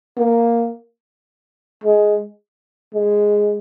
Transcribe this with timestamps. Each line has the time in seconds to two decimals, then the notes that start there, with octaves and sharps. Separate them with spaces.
0.18 A#3
1.84 G#3
2.94 G#3